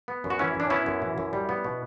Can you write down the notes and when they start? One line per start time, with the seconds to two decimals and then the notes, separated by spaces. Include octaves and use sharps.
0.08 B3
0.24 F#2
0.30 F#4
0.39 E3 C#4 E4
0.55 F#2 D4
0.70 B3 C#4 E4
0.86 F#2
1.02 E3
1.18 F#2
1.33 G3
1.49 B3
1.64 B2